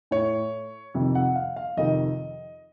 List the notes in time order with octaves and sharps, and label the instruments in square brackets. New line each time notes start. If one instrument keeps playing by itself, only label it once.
[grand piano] A2 C#5
F2 C3 D#3
F#5
F5
F5
F2 C3 D#3 D#5